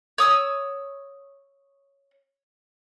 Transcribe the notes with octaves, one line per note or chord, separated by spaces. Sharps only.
C#5 D#6 E6